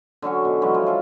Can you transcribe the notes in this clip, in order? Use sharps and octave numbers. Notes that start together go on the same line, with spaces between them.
D3 F#3 C#4 C#6
B2
E3 F#3 G#3 C#4
F3
F4 A4 E5